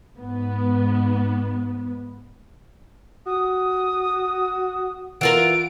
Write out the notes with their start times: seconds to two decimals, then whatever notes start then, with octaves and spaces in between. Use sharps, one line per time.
0.16 G#2 B3
3.26 F#4 D#6
5.21 E3 F4 A#4 F#5 D7